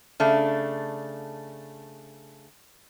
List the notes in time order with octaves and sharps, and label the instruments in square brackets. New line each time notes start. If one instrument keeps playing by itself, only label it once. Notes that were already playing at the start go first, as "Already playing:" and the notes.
[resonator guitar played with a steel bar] C#3 A3 D4